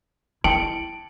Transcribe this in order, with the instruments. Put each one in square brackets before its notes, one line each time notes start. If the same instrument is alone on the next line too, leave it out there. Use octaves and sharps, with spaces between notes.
[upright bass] E4 [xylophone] G5 [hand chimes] A5 [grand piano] C#7 D7 F#7